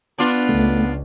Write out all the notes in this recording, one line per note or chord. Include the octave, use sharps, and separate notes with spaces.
B3 D4 F4
C#2 A3